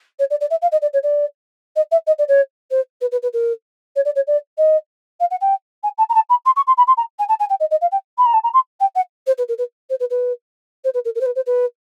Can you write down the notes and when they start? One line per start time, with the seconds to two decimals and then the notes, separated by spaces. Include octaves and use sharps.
0.19 C#5
0.30 D5
0.40 D5
0.50 E5
0.61 F5
0.71 D#5
0.81 D5
0.93 C#5
1.03 D5
1.76 D#5
1.91 E5
2.07 D#5
2.18 D5
2.28 C#5
2.70 C5
3.01 B4
3.11 B4
3.22 B4
3.33 A#4
3.96 C#5
4.05 D5
4.15 C#5
4.27 D5
4.58 D#5
5.20 F5
5.30 F#5
5.41 G5
5.83 G#5
5.98 A5
6.09 A#5
6.14 A5
6.29 B5
6.45 C6
6.56 C#6
6.67 C6
6.77 B5
6.87 C6
6.97 A#5
7.19 G#5
7.28 A5
7.39 G#5
7.49 G5
7.60 D#5
7.71 D#5
7.81 F5
7.91 G5
8.18 B5
8.26 A#5
8.33 A5
8.43 A#5
8.53 C6
8.80 G5
8.95 F#5
9.26 C5
9.38 B4
9.48 A#4
9.58 B4
9.89 C5
9.99 B4
10.10 B4
10.84 C5
10.94 B4
11.04 A#4
11.15 A#4
11.20 C5
11.25 B4
11.35 C5
11.46 B4